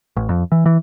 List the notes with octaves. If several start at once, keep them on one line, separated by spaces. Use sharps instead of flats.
A1
F2
E3
E3